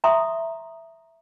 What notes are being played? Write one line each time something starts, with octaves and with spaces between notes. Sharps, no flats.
E5 A#5 C6 C#6 D#6